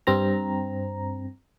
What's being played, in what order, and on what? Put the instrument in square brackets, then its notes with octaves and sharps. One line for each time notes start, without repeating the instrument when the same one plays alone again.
[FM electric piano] G2 C4 A#5